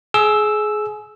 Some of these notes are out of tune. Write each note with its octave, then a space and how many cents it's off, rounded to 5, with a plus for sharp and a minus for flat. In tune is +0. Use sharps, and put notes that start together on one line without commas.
G#4 +25 E6 +0